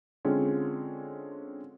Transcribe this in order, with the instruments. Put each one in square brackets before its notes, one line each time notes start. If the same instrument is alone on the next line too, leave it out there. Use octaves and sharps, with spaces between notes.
[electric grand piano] D3 G#3 C4 C#4 F4 G#4